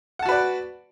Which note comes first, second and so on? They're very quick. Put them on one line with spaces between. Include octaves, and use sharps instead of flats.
F#5 A5 F#4 B4 D5